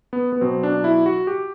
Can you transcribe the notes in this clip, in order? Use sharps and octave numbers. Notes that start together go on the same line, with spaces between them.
B3
B3
B2 F#3 C4
D4
E4
F#4
G4